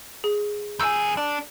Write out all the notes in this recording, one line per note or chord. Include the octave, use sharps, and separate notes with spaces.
G#4
D#2 G#4 E6 G6
D4